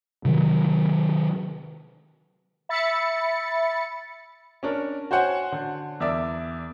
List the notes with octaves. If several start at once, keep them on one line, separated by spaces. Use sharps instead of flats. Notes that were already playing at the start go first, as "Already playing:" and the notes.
C3 D#3 F#3
E5 B5 A6 C#7
C#4 D4 A#4
F#4 C5 C#5 F#5 G#5
D3
E2 A#4 D5 E5 D6